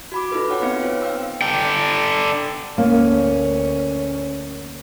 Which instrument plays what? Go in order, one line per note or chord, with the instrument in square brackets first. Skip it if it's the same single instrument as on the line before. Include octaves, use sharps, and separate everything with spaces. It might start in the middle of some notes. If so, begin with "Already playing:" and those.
[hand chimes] F#4 B5 D6
D#4 F4 A4 B4
B4 C#5 F#5 G5
B3 C4 D#4 F5 C#7
F4 C5 C#5
F5 G5 E6
[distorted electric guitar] D3 G5
[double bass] D2 C#4 [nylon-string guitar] A#3